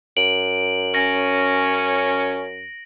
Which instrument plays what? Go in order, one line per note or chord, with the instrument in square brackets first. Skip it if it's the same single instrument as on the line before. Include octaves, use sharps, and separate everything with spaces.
[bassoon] F#2 [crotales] D7 F#7
[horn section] C#4 [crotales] A#6